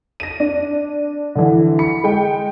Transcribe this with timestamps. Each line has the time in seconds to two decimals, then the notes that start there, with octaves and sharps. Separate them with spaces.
0.20 A#6 D#7
0.40 D4
1.35 D3 E3
1.79 B5 C#7
2.04 G#3 G5